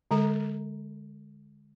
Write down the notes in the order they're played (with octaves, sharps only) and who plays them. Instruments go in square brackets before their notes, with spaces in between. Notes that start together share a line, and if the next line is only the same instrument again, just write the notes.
[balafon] D3 G#3 A4 A#5